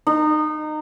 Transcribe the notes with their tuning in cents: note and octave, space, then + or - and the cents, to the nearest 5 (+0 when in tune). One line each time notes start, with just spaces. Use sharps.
D#4 -25